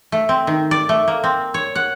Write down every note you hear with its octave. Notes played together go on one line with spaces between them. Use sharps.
A3
C4
D#3
D5
A3
A#3
C4
C#5
F#5